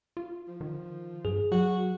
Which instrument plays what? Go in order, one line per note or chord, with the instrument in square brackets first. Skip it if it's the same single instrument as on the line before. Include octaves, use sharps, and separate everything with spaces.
[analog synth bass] F4
[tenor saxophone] F3
[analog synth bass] D#3
[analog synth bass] G2 [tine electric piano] G#4
[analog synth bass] F#3 [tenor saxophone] F#4